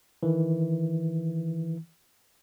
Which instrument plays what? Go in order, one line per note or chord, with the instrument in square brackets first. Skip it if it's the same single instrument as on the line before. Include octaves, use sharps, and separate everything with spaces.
[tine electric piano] D#3 E3